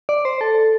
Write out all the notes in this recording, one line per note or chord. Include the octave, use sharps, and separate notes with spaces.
D5
C5
A4